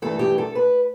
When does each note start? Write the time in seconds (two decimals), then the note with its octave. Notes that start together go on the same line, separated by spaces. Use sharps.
0.02 G2 E3 A3 A4
0.19 G4
0.38 A4
0.55 B4